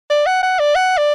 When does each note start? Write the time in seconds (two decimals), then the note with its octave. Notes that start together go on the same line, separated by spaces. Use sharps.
0.10 D5
0.26 F#5
0.43 F#5
0.60 D5
0.75 F#5
0.98 D5